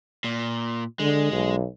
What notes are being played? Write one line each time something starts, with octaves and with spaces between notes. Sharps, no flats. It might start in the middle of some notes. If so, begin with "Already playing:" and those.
A#2
D3 G#3
B1